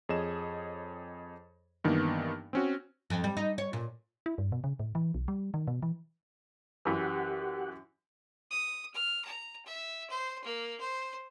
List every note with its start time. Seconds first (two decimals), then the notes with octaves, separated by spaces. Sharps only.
0.09 F2 G#4 C#5 D#5 E7
1.84 G2 D#3 E3 A#3 B3
2.53 C4 C#4 F#4
3.10 F2
3.24 G3
3.37 D#4
3.58 C#5
3.73 A#2
4.26 E4
4.38 G2
4.52 B2
4.64 C#3
4.79 A2
4.95 E3
5.14 B1
5.28 G3
5.54 D#3
5.67 B2
5.82 E3
6.85 F#2 E3 G4 F#5
8.51 D#6
8.94 F6
9.25 A#5
9.65 E5
10.10 C5
10.44 A#3
10.80 C5